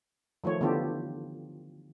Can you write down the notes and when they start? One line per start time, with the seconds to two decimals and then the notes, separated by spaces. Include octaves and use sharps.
0.44 D#3 F3 A3 C#5
0.61 D3 E3 B3 F4 G4 A4